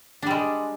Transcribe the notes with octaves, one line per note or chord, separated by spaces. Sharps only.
G3 G#3 D4